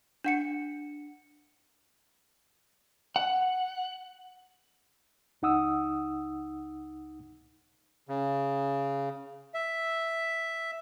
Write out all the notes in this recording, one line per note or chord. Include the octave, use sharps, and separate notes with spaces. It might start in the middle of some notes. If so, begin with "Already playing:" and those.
D4 F#5 C#7
F#5
C#2 D#4 F#5 D#6 E6
C#3
E5